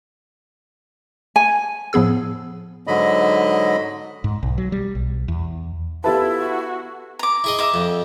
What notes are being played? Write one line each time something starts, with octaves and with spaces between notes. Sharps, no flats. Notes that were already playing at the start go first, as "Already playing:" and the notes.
G#5
A2 F3 B3 G#4 E6
G#2 D3 F#3 D#5 B5
G#2
B1
F#3
G3
B1
E2
B3 E4 F4 G4 A4 B4 E5 A5
F#4
A#5 D6
E4 G#4 D#5
E5 A#5 D6
F2